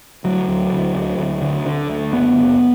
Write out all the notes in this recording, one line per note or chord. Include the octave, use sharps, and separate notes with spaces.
D2 F#3
D2
D3
D2
D2
D3
D3
D2
F#1 B3
F#1